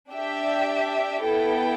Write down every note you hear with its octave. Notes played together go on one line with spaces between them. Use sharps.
D4 G4 E5 G5
B3 E4 A4 G5